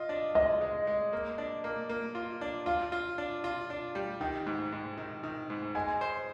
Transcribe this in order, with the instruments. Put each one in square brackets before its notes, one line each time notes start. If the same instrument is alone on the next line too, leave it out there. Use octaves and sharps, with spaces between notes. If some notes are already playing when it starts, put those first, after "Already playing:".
Already playing: [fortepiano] F4 [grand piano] D#5
[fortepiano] D4
[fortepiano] G#3 [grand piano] D#5
[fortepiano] G#3
G#3
A#3
D4
A#3
A#3
F4
D4
[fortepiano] F4 [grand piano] F5
[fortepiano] F4
D4
F4
D4
G3
[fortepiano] D#3 [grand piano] G5
[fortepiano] G#2
G#2
D#3
D#3
G#2
[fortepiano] G#3 [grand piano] G#5
[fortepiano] C5